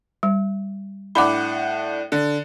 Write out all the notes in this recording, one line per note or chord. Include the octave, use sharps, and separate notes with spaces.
G3
A2 D4 F#5 B5 D6
D3